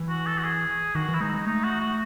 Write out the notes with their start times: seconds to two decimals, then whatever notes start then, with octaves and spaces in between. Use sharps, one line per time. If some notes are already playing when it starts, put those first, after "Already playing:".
Already playing: E3
0.09 F#4
0.26 A4
0.38 F#4
0.44 G#4
0.95 D#3 F#4
1.09 E3
1.15 E4
1.21 G#3 D#4
1.34 G#3
1.47 A3 D#4
1.64 F#4
1.81 F#4